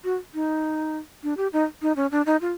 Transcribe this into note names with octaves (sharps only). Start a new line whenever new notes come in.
F#4
D#4
D4
G4
D#4
D#4
C#4
D4
D#4
F4